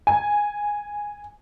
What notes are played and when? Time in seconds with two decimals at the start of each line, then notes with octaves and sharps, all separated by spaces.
0.07 G#5